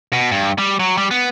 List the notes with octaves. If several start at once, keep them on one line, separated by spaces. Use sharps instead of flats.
B2
G2
G3
F#3
G3
B3